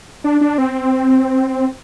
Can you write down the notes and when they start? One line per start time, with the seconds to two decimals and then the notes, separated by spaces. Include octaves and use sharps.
0.24 D4
0.41 D4
0.58 C4